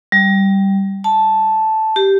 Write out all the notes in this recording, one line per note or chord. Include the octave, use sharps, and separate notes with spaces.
G3
A5
G4